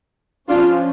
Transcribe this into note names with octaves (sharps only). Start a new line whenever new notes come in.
F3 C#4 D4 F4